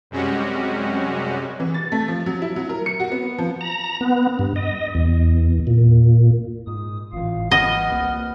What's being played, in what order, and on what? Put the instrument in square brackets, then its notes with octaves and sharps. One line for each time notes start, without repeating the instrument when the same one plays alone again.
[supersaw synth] F#2 C3 G3 G#3 C#4 F#4
[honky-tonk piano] E3
A6
A3
F3
F#3
E4
F#3
A#4
C#7
F#4
B3
F3
[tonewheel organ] A#5
B3
G2
D#5
E2
A#2
[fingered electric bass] G#2 [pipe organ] D#6
[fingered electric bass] G#1 E3 [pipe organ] A2 F4 F5
[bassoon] B3 [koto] D#5 [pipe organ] F6
[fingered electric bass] C2 A#3